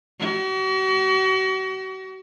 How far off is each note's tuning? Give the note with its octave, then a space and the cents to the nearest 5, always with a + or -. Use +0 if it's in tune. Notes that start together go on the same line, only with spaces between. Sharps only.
F#4 +40